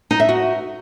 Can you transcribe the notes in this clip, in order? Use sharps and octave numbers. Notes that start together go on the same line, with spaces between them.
D#4
E5
F#4